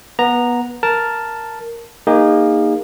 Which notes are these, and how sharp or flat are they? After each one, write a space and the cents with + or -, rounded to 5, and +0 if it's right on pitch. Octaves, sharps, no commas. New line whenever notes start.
B3 -20 A#5 +0
A#4 +0 A5 +0
A#3 +0 D#4 +0 G#4 -35